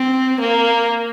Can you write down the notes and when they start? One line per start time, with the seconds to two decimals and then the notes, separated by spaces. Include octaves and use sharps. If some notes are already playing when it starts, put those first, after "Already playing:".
Already playing: C4
0.40 A#3